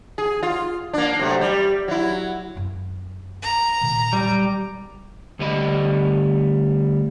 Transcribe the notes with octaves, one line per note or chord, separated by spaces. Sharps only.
G#4
F4
A#3 D4
C3 F#3 A3
G3
F#3 E4
F#2 E4
A#5
A#2 D#3
G3
D2 G3 D#5 B5